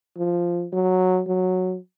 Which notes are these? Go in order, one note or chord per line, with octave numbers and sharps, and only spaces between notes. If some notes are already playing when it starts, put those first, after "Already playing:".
F3
F#3
F#3